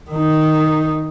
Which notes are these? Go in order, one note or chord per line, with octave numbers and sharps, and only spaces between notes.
D#3 D#4